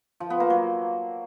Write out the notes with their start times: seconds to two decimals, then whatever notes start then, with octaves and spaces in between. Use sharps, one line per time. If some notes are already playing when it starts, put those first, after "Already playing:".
0.20 F3
0.30 B3
0.40 A#3
0.50 F#3